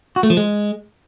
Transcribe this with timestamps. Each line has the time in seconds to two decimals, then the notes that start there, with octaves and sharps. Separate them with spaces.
0.16 F#4
0.23 A3
0.30 F3
0.37 G#3